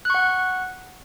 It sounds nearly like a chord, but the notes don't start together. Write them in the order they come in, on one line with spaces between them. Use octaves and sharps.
F#6 C#6 F#5